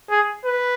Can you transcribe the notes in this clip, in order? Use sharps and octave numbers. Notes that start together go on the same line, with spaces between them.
G#4
B4